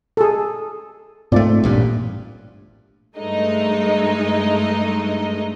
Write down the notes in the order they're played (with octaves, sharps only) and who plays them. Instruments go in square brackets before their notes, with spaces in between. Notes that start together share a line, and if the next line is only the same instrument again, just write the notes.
[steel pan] G#4 A4
[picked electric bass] G#2 A3 [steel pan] C4 F4 D5
[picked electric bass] A1 G2 A#2
[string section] G2 G#3 A3 D#4 D#5